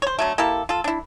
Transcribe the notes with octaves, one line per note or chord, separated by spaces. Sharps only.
C5 C#5
D3 F#3 A3
A#3 E4 G4 A4
F4 A4
D4 E4